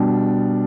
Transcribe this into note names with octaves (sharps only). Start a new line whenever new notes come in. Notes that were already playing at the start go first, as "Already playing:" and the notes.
Already playing: B2 G3 D4